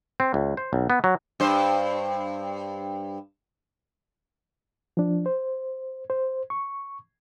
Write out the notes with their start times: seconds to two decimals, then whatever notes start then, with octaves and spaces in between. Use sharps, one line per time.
0.20 C4
0.34 C#2
0.57 C5
0.73 B1
0.90 B3
1.04 F#3
1.40 G2 C5
4.97 F3 D4
5.26 C5
6.10 C5
6.50 C#6